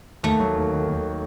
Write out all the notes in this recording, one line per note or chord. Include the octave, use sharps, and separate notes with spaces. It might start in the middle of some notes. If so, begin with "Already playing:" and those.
D#2 A3
F#3
D#2
D#3
D#2